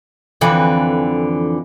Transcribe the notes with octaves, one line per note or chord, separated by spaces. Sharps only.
F2 D3 E3